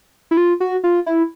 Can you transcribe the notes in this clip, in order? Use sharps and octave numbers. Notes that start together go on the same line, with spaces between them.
E4
F4
F#4
F4
E4